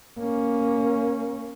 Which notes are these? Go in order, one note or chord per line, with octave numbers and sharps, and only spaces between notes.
A#3 C#4